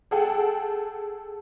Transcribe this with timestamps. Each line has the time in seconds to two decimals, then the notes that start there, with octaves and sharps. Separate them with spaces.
0.11 G#4 A4 F#5 G5